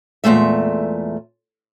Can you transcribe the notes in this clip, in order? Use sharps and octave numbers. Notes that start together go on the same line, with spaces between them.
E2 A#2 G#3 A3 E5